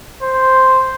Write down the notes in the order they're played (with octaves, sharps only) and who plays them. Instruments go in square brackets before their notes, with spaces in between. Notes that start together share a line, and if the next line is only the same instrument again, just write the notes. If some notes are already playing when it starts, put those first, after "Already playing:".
[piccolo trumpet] C5